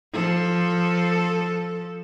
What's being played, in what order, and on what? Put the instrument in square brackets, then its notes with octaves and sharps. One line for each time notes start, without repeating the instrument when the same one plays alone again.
[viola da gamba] F3 A4